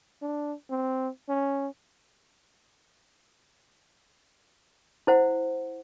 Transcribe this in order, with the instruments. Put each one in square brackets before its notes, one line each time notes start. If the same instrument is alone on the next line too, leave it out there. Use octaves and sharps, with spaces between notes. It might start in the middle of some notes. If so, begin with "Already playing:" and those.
[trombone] D4
C4
C#4
[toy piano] E4 C5 F#5